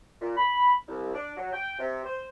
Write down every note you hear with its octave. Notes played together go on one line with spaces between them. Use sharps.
A#2
B5
C2
D4
F#3
G5
C3
C5